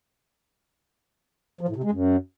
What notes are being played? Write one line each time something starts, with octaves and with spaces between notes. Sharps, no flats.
F3
A2
C3
G#3
F#2